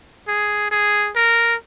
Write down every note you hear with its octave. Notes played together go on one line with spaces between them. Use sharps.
G#4
G#4
A#4